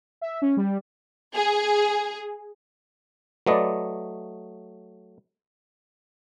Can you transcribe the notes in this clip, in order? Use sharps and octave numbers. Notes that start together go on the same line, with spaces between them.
E5
C#4
G3
G#4
F#3 A3 B4 D5 D#5